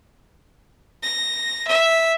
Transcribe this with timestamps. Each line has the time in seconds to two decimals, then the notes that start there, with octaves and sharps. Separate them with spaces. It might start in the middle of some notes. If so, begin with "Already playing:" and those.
1.03 A#6
1.68 E5